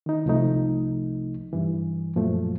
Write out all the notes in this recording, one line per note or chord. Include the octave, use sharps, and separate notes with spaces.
D#3 D#4
C2 C3 F3 A3 D#4
G2 E3
F#2 A#2 F3 F#3 A3